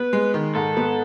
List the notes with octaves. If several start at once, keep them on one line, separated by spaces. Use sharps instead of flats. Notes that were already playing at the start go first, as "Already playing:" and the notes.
Already playing: B3 B4
G#3
D#3
G#2 A4
B3